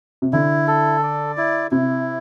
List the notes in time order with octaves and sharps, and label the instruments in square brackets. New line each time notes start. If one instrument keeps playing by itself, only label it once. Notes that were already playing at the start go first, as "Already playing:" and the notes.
[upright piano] C3
[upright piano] D3 [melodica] E4
[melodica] A4
D5
E4
[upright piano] C3 [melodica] E4